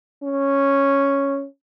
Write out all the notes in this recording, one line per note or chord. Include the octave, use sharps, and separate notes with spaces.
C#4